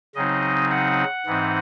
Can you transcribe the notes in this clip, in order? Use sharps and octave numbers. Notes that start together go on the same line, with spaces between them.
C#3 F#3 C4 D#4 D#5
F#5
G#2 E3 C4 D#4